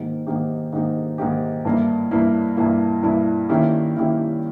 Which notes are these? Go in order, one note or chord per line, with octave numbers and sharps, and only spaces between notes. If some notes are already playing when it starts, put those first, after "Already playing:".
Already playing: G#2 D#3 A#3 D#4 G4
G#2 D#3 A#3 D#4 G4
G#2 D#3 A#3 D#4 G4
G#2 D#3 A#3 D#4 G4
G2 E3 A#3 E4
G2 E3 A#3 E4
G2 E3 A#3 E4
G2 E3 A#3 E4
D#3 A#3 C#4 E4 G4
D#3 A#3 C#4 E4 G4